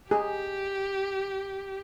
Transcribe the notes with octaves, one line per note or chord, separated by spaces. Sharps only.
G4 G#4